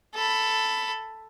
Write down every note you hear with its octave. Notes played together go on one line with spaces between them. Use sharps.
A4 B5